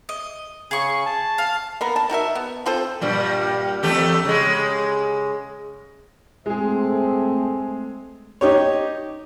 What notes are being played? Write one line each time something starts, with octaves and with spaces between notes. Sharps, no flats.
D#5
C#3 G#4 C#6
A5
F5
A#3 B3 A#4
A5
D#3 F#4 A#4 E5
B3
C4 F4 A4 C5
G2 A#2 G3
E2 A3 G4
C#3 G#3
G#3 A3 C4 G#4
D#4 G4 C#5